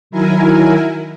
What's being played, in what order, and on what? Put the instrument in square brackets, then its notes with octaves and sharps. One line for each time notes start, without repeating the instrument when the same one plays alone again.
[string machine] D#3 F#3 E4 A#4 G#5